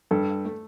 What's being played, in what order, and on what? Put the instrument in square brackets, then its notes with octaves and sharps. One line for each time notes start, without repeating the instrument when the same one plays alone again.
[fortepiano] G2 [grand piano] A4
[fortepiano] A3